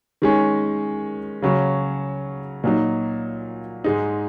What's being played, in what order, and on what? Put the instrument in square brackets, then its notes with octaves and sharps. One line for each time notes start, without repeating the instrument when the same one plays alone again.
[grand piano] D#3 G#3 C#4
C#3 F#3 C#4
A#2 F#3 D#4
G#2 G#3 D#4